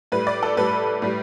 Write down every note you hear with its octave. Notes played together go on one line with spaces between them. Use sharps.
A2 G3 B4
D5
A4
A2 G3 B4
A2 G3